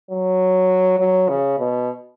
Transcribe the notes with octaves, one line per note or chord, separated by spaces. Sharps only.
F#3
F#3
C#3
B2